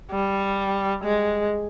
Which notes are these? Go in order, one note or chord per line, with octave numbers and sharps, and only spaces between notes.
G3
G#3